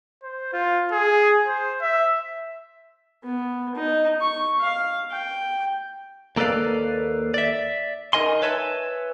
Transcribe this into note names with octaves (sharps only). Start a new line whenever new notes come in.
C5
F4
G#4
C5
E5
B3
D#4
C#6
F5
G5
D#2 A#3 A4 B4 D5 F5
D5 E5
D#4 A#4 D#5 G#5 C6
B4 C#5 E5 G#5 A5